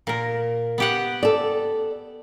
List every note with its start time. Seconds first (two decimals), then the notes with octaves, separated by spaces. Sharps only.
0.07 A#2 A#4
0.78 B3 G4 F#5
1.23 A4 D5